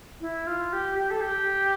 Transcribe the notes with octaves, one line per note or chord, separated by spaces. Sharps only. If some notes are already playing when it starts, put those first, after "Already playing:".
E4
F4
G4
G4
A4
G4